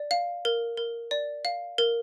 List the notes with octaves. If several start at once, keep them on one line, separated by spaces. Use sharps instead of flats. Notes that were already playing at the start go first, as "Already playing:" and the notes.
Already playing: D5
F5
A#4
A#4
D5
F5
A#4